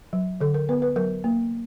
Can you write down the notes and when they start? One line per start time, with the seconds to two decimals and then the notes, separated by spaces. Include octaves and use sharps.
0.13 F#3
0.41 D3 A4
0.54 A#4
0.69 B3 B4
0.82 B4
0.96 F#3 A#4
1.24 A#3